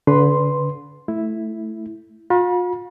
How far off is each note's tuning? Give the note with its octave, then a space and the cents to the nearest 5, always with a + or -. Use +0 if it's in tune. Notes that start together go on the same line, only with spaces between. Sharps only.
D3 -35 B4 +0 C6 +0
A3 +0 E4 +0
F4 +40 B5 -40